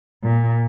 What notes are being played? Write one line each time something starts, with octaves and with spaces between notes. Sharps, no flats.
A#2